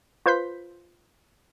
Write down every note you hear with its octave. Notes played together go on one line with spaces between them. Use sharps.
F4 B4 C5 C6 G6 B6